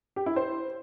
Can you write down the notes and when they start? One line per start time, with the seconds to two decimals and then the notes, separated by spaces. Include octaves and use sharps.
0.16 G4
0.26 E4
0.36 C5